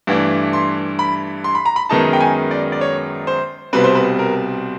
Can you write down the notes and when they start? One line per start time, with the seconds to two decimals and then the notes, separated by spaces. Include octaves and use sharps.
0.07 G2 E3 A3 D4
0.53 C6
0.99 B5
1.44 C6
1.55 B5
1.65 A#5
1.76 B5
1.89 F#2 D#3 G#3 B3 D#4 A5
2.13 G5
2.21 G#5
2.51 D5
2.72 D5
2.81 C#5
3.27 C5
3.73 C2 B2 G3 C4 B4
3.84 C5
3.95 B4
4.19 A#4